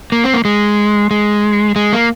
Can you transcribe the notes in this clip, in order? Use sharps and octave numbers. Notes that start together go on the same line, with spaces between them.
A#3
C4
A#3
G#3
G#3
G#3
A#3